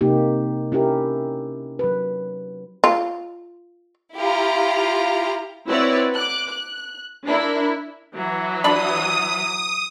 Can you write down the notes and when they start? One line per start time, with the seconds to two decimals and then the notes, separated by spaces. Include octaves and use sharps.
0.01 C3 A#3 D#4 G4
0.72 C#4 E4 G4 A#4
1.79 F#3 B4
2.84 F4
4.16 E4 F4 G4 F5 A#5
5.68 C4 E4 F#4 B4 C#5 D5
6.15 D6 F#6
6.51 F#6
7.26 D4 E4 A#4
8.15 E3 F#3
8.64 D4 E5 B5 D#6